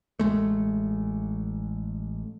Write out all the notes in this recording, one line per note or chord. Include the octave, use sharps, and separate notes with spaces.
A1 G#3 A3